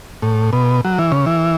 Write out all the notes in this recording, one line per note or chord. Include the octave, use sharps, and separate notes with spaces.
A2
B2
F#3
E3
C#3
E3